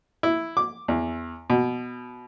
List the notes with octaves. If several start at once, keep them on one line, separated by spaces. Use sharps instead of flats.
E4
D6
E2
B2